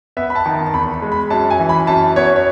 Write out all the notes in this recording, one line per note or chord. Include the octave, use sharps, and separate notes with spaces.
B3 E5
B5
A5
D#3
A5
A5
E2 B5
G#3
B5
F#2 A5
G#5
E3
B5
F#2 A5
B3 C#5
C#5